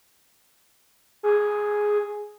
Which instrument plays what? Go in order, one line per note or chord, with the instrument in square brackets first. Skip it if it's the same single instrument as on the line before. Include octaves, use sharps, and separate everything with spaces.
[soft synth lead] G#4